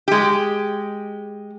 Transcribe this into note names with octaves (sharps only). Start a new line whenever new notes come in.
G#3 G4